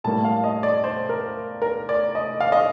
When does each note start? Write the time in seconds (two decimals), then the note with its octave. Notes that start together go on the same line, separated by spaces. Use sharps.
0.04 A2 G3 A#3 A5
0.24 F5
0.44 D#5
0.63 D5
0.84 C5
1.09 A#4
1.62 A#4
1.89 D5
2.15 D#5
2.41 F5
2.52 D#5